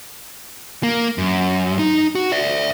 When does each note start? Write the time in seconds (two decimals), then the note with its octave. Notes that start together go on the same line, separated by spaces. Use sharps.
0.83 A#3
1.18 F#2
1.79 D#4
2.15 F#4
2.32 D5 E5